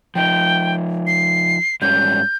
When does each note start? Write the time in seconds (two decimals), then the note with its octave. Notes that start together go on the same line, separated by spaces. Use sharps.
0.15 F3 D#4 G5
1.07 C7
1.82 G#2 G3 C#4 G6